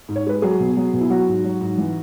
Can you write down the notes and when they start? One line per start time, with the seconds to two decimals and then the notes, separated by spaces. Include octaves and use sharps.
0.09 G#2
0.16 C#5
0.26 G#3 B4
0.42 F#3 G#4
0.60 B2
0.77 F#3
0.93 B2
1.00 E4
1.10 F#3 F#4
1.28 G#2
1.44 F#3
1.61 G#2
1.78 E3